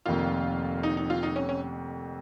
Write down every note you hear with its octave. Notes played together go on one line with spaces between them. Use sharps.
F1 F2 D#3 A#3 F4
D#4
D#4
F4
D#4
C#4
C#4